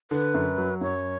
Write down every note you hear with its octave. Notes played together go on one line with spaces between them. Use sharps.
D3 B4
F#2
F#3
F#2 C#5